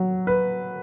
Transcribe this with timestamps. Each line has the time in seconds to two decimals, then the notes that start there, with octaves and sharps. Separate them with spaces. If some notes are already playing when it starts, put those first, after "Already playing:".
Already playing: F#3
0.27 B4